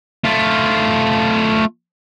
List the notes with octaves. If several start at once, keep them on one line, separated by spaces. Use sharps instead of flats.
A3 F4